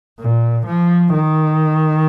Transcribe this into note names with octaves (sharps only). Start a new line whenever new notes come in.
A#2
F3
D#3